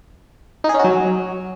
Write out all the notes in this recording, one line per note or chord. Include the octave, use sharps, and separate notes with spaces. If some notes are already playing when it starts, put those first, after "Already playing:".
D#4
G#4
C#4
F#4
F#3